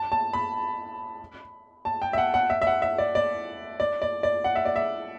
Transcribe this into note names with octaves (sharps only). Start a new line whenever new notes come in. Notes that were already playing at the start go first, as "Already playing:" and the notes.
Already playing: A5
A5
B5
A5
G5
E5
F#5
F#5
E5
E5
F#5
E5
D5
D5
D5
D5
D5
F#5
E5
D5
E5